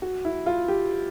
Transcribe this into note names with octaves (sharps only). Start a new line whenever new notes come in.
F#4
E4
F4
G4